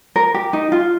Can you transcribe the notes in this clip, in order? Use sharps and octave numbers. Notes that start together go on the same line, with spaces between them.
A#4
G4
D#4
F4